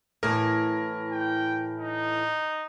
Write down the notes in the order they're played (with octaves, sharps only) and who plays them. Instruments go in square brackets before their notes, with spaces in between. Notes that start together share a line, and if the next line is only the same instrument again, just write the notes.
[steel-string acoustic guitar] A2 E3 [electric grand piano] A#4
[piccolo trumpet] G5
D#4